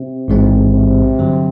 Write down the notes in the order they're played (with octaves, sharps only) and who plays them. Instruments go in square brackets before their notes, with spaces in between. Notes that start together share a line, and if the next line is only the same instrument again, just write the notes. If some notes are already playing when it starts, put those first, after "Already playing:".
Already playing: [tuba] C3
[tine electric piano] A1 G#2 E3 G#3 C4
[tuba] C3
[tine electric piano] G2 D3 F#3